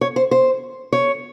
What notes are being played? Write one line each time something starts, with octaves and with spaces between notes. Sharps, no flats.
C#5
C5
C5
C#5